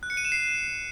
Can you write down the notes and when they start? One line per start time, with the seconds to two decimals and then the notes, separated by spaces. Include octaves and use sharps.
0.03 F#6
0.10 C#7
0.17 D#7
0.25 E7
0.32 C7